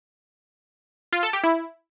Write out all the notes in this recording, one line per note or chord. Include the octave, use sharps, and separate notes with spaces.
F4
A4
G4
E4